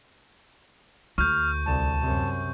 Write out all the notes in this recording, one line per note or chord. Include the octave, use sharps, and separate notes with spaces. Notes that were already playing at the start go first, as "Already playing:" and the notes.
D2 C#6 F6 G6
C2 A5
F#2 C3